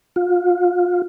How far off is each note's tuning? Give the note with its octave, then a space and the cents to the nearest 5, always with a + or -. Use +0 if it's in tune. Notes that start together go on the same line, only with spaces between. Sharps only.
F4 +30